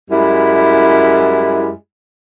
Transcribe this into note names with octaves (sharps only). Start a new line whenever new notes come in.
F#2 G3 G#3 E4